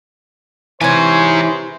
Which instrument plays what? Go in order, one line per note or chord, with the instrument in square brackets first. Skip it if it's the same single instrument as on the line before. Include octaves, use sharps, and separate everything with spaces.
[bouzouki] C3 C#5 [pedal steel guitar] E3 [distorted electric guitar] D#4 G#5 [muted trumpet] C5